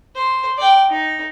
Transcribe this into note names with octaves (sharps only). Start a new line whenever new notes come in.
C5
D5 G5
D#4